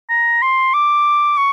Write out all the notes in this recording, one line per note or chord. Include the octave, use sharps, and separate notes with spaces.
A#5
C6
D6
C#6